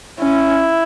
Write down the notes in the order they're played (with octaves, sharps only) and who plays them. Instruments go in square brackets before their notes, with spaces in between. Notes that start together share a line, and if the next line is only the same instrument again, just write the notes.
[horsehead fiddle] C#4 [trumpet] E4